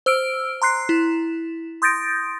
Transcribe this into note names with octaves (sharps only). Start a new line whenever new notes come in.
C5 E6 F6 D7
A#5 C6 F#6 C7
E4
C6 D#6 G6 A6 A#6 D7